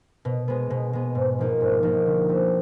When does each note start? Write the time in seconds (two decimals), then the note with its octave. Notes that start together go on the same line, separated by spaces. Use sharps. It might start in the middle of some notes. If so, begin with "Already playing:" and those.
0.25 B2
0.48 G#3 B3
0.70 B2
0.93 G#3 B3
1.15 G#2
1.39 F3 A#3 D#4
1.61 G#2
1.83 F3 A#3 D#4
2.06 D3
2.29 G3 C4